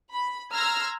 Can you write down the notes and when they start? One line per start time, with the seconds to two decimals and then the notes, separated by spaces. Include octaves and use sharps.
0.13 B5
0.53 A#5 C6 E6 F6 G#6 A#6